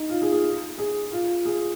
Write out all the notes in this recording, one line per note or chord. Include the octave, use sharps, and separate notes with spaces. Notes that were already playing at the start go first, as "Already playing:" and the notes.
Already playing: D#4
F4
G#4
G#4
G#4
F4
G#4